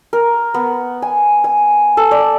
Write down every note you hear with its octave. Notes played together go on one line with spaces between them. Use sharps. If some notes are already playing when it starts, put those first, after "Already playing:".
A#4
B3
G#5
G#5
A4
D5